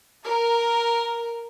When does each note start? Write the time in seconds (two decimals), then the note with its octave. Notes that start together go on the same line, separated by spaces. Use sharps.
0.23 A#4